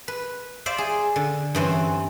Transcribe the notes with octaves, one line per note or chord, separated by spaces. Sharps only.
B4
C5 D5 E5 F5
G#4
D3
G2 E3 C4 C#4